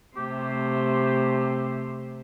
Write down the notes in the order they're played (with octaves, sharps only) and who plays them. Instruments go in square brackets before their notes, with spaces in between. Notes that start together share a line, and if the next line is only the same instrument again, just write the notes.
[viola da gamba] C3 A3 C5 [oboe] G4